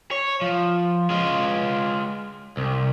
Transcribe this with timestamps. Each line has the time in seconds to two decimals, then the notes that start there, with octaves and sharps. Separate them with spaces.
0.11 C#5
0.41 F3
1.10 G#3 F4
2.57 C2